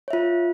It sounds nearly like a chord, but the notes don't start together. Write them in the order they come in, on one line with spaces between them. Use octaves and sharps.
C#5 E5 F4